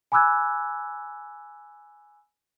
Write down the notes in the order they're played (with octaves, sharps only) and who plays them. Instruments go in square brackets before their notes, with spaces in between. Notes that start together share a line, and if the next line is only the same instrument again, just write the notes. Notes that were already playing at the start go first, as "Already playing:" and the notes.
[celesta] G#5 B5 D6 E6 F#6 G#6